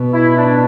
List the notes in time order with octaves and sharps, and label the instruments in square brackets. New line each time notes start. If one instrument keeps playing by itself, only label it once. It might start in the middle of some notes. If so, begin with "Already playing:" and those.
Already playing: [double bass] B2
[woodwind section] E4
D4